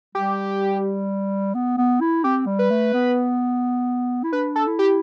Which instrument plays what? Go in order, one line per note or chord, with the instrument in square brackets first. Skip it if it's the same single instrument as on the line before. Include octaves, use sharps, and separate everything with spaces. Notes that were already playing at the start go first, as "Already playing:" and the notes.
[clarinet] G3 [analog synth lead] G4
[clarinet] B3
B3
E4
[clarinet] C4 [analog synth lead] G4
[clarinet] G3
[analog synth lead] B4
[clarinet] A3
B3
E4
[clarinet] D4 [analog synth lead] B4
[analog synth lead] A4
[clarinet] E4
[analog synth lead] G4